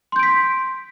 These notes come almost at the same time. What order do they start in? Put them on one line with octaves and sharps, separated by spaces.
C6 G6 D7 B6